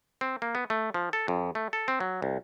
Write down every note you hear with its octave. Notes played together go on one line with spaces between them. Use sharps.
C4
A#3
B3
A3
F3
A4
F2
A3
A4
C4
F#3
C2